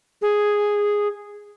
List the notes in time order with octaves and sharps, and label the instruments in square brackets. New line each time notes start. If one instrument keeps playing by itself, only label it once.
[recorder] G#4